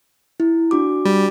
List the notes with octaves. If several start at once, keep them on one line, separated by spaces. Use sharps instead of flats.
E4
D4 F#4 D6
G3